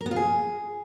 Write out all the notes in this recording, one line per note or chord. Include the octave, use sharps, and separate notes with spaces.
A#4
B3
F4
G#4